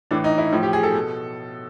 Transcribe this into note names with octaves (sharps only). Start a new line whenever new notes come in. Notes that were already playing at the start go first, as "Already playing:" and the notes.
A2 E3 D4
D#4
E4
A2 F3
G4
G#4
A4
B2